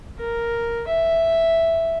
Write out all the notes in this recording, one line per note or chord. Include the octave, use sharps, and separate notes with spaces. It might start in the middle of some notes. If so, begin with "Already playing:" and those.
A#4
E5